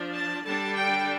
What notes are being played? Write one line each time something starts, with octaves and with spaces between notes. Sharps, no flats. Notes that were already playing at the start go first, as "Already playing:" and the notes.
Already playing: F3 D4
A5
D3 G3 D4 A5
G5